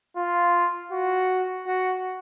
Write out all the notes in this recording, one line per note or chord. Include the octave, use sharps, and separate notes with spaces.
F4
F#4
F#4